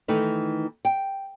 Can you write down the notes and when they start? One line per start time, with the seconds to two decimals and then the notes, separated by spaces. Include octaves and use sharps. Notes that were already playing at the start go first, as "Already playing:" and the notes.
0.08 D#3 E3 A3 D#4
0.85 G5